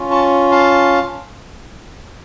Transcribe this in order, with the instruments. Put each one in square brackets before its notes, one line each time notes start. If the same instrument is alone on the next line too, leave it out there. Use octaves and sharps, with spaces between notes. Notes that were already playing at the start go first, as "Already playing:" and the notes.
Already playing: [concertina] C#4 F4
A5 C#6
F5 A5